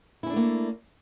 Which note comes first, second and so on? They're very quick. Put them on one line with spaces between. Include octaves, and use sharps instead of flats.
E4 C#4 D4 A3 A#3